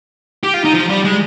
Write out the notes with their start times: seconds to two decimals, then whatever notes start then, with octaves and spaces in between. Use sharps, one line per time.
0.44 G4
0.54 F4
0.65 D#4
0.74 F3
0.89 G3
1.04 G#3